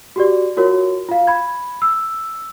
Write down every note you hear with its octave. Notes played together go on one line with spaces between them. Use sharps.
F#4 G4 D5
F4 F#4 A#4 C#5
F4 F5
B5 G#6
E6